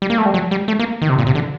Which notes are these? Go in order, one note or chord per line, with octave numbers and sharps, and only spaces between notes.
G3
A#3
A3
G3
F#3
G3
A3
A#3
D#3
C3
A#2
C3
D3